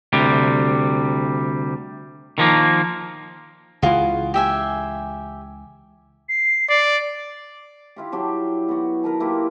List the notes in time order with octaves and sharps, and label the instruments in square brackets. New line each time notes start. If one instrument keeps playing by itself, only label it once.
[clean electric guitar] D2 C3 G3
D#3 F3 A#3
[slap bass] C#2 E3 [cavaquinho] F4 F#4 G#4
[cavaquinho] G4 E5 G#5
[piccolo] C7
[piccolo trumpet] D5
[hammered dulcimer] E4 F4 G4
F#3 D4 G4
B3 F#4
A#4 B4 A5
A#3 E4 F4 G4